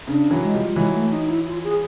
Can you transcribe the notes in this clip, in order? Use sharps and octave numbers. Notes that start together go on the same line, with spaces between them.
C#3 D4
E3 F#3
G#3
F3 G3
E3 F#3 G#3
A3
D#4
E4
F4
G#4